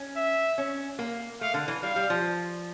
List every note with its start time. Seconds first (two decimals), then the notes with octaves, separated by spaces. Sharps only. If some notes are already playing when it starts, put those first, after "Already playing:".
Already playing: C#4
0.16 E5
0.58 C#4
0.99 A#3
1.41 A3 F5
1.54 D3
1.68 E3
1.82 G3 F5
1.96 G3
2.10 F3